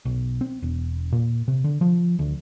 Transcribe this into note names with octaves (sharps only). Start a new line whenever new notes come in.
B1
C4
E1
A#2
C3
D3
F3
D2